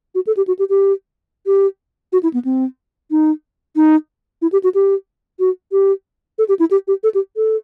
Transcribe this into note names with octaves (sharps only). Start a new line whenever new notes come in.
F#4
A4
G4
F#4
G4
G4
G4
F#4
E4
B3
C4
D#4
D#4
E4
G4
F#4
G4
F#4
G4
A4
G4
E4
G4
G4
A4
G4
A4